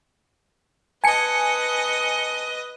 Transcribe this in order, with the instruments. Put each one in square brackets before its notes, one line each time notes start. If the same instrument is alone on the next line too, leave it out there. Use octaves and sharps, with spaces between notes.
[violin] B4 D#5 [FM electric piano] G#5 C#7 [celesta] A5